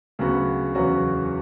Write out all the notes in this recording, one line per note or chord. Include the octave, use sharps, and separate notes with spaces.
D2 C#3 F#3 B3 F#4
E2 C#3 F#3 C#4 F#4